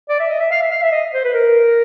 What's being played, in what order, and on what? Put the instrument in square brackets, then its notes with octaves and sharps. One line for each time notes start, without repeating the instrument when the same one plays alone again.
[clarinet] D5
E5
D#5
E5
F5
E5
F5
E5
D#5
C5
B4
A#4